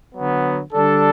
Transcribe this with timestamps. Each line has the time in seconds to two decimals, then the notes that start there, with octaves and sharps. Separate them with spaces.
0.15 D3 F#3 B3
0.73 D3 G3 D4 A4